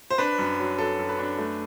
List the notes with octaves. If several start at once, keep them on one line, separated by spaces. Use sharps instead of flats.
C5
D4 B4
F#2
F#3
F#3 A4
F#2
B4
D4
A3